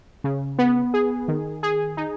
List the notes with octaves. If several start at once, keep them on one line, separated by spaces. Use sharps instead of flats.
C#3
B3
G#4
D#3
G#4
D#4